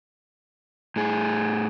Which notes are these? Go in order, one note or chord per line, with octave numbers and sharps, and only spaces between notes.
A2 G#4